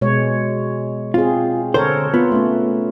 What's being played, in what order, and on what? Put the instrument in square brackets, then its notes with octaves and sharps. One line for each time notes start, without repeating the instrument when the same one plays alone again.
[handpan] B2 G#3 C#5
[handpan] C4 G#4 [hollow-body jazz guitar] F4
[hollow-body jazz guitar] D3 C5 [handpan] A4 A#4 C#5
[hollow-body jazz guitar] B3 [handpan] F4
[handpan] A3 C#4